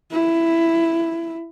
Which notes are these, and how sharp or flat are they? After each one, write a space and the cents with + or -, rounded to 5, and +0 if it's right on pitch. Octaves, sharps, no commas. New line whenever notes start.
E4 +10